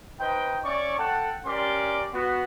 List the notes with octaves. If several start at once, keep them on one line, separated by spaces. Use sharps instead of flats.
D#4 B4 C5 D#5 G5
C#4 C#5 D5 E5 C#6
A4 F#5 G5 A5
C#4 G4 A#4 D5 C6 D6
B3 F#4